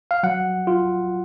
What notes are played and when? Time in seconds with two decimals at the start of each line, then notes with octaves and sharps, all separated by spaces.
0.11 F5
0.23 F#3 F#5
0.67 F4